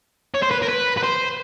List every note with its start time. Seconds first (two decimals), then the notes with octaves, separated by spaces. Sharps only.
0.34 C#5
0.42 C5
0.51 B4
0.62 A#4
0.69 B4
0.97 B4
1.03 C5